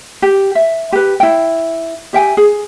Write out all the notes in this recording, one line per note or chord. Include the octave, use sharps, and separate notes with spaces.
G4
E5
G4 B4
E4 G5
G4 E5 G5 G#5
G#4